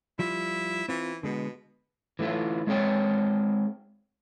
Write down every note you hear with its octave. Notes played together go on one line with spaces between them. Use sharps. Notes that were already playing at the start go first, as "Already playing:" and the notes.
F3 G3 E4 F4
E3 C4 F4
B2 D3 G#3 B3
E3 A3 C4 E4 F4
G#3 C4 G#4 C#5 G5